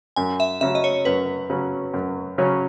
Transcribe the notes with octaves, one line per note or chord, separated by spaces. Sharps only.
F#2 G#5
E5
C#3 F#3 C#4 E5
D#5
C#5
F#2 B4
C#3 F#3 C#4
F#2
C#3 F#3 C#4